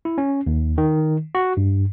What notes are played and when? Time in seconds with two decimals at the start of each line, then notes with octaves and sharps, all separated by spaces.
0.05 E4
0.18 C#4
0.46 D#2
0.78 D#3
1.35 F#4
1.57 G2